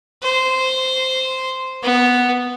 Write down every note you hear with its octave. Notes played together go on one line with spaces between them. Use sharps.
C5
B3